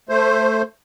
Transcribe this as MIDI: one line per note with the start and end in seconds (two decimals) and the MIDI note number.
0.09 0.62 57
0.09 0.62 72